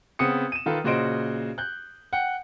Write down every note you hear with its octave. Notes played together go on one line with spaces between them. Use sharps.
C#3 B3 C4 D#6 C#7
D#7 E7
D#3 F4 A4 B4
A#2 C#3 F#4 C5 D#5 D7
F#6 G6
F#5 G5